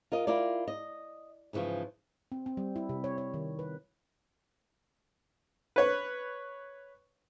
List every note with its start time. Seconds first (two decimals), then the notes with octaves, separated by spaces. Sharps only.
0.12 F4 A#4 D#5
0.27 E4 F4 A#4 D5
0.68 D#5
1.53 G#2 C#3 E3 F3
2.32 C4
2.46 C4
2.57 G3
2.76 E4
2.89 C3
3.04 C#5
3.18 C#5
3.34 D#3
3.59 B4
5.76 B4 C#5